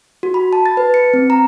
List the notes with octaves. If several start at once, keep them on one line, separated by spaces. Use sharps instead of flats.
F#4
B5
A5
A6
B4
C#7
C4
A#5